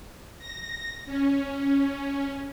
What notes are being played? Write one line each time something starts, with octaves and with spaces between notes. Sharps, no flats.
A#6
C#4